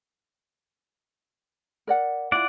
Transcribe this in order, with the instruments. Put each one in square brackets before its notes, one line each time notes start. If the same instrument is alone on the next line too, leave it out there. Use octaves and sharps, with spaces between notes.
[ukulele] A#4 D5 F#5
[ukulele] E4 F4 [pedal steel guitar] D5 F#5